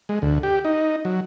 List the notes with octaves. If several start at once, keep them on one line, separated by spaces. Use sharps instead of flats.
G#3
D2
G4
D#4
F#3